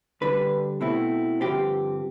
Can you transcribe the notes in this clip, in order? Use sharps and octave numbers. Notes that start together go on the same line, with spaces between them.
D2 D3 G3 D4 B4
B2 A3 C4 E4
G2 D3 F3 C4 G4